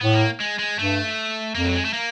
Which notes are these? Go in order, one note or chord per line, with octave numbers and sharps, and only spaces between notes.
A2 B3
A#3
G#3
G#3
G2 A3
F2 A#3
F#3
G#3
A3
A#3